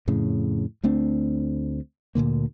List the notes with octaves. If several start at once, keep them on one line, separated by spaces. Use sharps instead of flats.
F2 A2 C#3
D2 A3 C4 D4
D2 A#2 D3 A#3